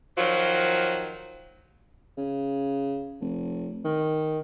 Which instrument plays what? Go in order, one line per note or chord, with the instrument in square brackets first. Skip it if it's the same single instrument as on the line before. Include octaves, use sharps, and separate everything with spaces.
[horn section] D#3 F3 F#3
[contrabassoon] C#3
F1
D#3